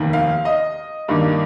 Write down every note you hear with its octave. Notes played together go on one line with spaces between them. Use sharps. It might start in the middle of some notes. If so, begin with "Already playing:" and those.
Already playing: F1 D#2 D#3
F5
D#5
G2 D#3 A#3 D4